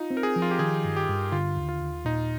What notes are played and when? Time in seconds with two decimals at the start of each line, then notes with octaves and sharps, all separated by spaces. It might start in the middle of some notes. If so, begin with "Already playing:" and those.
Already playing: D#4 F4
0.11 C4
0.17 A#4
0.23 G#4
0.36 F3
0.42 F4
0.51 G4
0.59 D#3 G#4
0.84 G2
0.96 G4
1.09 G2
1.32 D3 F4
1.57 D#2
1.69 F4
1.81 D#2
2.05 A#2 D#4